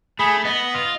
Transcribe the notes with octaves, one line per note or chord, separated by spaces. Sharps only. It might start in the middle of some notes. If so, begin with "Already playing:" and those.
A3 G#4 B5
B3 D#5
F4